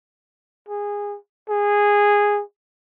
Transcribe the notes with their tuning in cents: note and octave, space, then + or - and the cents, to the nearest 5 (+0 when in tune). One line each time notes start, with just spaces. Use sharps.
G#4 -20
G#4 -15